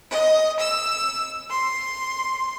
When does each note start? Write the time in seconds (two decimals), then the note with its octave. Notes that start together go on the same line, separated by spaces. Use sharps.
0.12 D#5
0.59 E6
1.50 C6